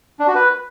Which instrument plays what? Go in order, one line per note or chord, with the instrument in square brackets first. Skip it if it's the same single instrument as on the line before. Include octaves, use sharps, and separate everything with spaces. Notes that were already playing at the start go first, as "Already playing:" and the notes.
[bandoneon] D4
F#4
B4